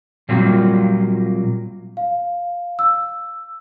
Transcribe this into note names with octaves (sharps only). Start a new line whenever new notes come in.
A#2 F#3 G3 A#3 C4 F4
F5
E6